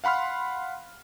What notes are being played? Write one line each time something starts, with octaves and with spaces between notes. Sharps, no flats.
F5 F#5 B5 C6 F6